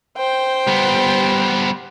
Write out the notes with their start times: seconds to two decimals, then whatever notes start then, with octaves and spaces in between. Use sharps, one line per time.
0.17 C5 G5
0.67 G3 B3